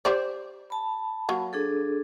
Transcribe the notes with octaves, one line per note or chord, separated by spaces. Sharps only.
G4 C5 D5
A5 B5
F#3 A#3
D4 G#4 A4